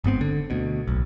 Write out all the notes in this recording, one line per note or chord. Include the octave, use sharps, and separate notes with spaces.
G1 G#2 B3 C4
D3
D2 B2
D1 B1